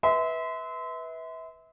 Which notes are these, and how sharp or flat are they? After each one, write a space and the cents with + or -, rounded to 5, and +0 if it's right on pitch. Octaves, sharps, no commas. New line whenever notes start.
B4 -5 E5 -30 C6 -35